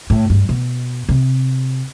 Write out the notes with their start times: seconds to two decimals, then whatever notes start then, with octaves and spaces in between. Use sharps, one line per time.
0.10 A2
0.30 G2
0.49 B2
1.09 C3